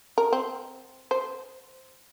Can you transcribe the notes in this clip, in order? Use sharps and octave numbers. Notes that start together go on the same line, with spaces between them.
A#4
C4
C5